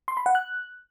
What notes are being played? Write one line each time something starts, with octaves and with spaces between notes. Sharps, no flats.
C6
B5
F#5
F#6